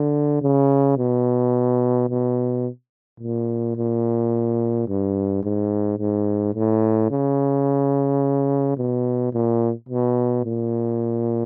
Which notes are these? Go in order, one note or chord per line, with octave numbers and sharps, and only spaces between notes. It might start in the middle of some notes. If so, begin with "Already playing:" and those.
Already playing: D3
C#3
B2
B2
A#2
A#2
G2
G#2
G#2
A2
C#3
B2
A#2
B2
A#2